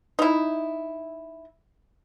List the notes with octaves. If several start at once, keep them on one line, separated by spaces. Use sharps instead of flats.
D#4 E4